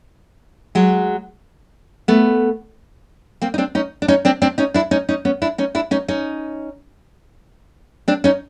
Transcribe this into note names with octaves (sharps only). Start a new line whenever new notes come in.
F#3 G#3
A3 B3
A#3 C4
D#4
C4 D4
C#4 D#4
D4
C#4 D#4
C4 D4
C4 D4
C#4 D#4
D4 E4
C#4 D#4
C#4 D#4
B3 C#4
D4 E4
C#4 D#4
D4 E4
C#4 D#4
C#4 D#4
C4 D4
C#4 D#4